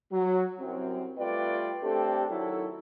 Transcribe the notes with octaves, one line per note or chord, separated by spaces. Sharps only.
F#3
C2 F#2 F#3 C4
G3 A3 F4 B4 D5 G5
A3 C4 D4 G4 A4
D#3 F#3 E4 A4